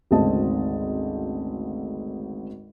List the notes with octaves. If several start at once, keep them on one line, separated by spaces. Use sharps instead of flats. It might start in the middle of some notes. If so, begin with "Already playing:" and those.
G#1 D2 C#3 C4 D#5 A5